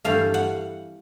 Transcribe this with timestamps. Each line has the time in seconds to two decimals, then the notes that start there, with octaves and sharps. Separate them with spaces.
0.05 G2 E3 A3 F5
0.34 F#5